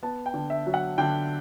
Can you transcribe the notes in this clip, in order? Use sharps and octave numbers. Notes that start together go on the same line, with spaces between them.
B3 A5
G5
D3
E5
F#3
F#5
D3 G5